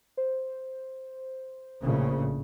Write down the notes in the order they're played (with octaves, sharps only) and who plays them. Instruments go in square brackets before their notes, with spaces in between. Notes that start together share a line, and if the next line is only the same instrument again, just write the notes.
[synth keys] C5
[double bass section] A#1 A2 C#3